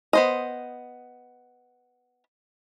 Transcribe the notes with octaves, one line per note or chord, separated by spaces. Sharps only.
B3 C5 D#5